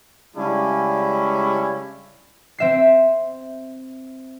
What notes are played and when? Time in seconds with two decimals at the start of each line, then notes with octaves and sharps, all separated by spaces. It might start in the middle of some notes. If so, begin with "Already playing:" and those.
0.37 C#3 G3 G#3 C#4 D4 E4
2.58 C4 E5 C7